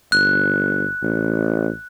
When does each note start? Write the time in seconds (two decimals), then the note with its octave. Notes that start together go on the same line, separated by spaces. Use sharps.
0.12 G1 F#6
1.02 A1